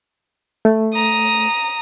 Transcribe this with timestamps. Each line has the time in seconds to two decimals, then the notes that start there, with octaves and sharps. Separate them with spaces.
0.65 A3
0.94 A#5 D#6